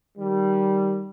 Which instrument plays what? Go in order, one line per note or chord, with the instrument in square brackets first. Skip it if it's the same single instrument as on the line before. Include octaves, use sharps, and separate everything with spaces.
[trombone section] D#3 G3